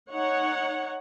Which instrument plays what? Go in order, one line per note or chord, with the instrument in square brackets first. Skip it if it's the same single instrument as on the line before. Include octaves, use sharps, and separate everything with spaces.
[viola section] D#4 C#5 F#5